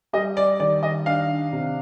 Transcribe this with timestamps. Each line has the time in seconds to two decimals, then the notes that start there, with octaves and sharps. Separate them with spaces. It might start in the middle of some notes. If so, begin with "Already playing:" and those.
0.13 G3 D#5
0.37 D5
0.60 D#3 D5
0.83 D#5
1.06 D4 F5
1.52 C3